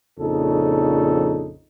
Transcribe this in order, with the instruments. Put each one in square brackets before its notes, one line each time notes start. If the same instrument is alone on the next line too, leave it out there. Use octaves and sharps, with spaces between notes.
[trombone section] A#1 F2 C#3 D#4 A4